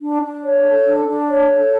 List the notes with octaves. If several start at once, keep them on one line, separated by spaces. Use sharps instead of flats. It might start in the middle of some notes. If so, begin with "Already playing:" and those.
D4
D4
C#5
A4
D4
D4
C#5
A4